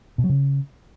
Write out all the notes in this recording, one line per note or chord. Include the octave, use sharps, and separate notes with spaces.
B2
F#3
C#3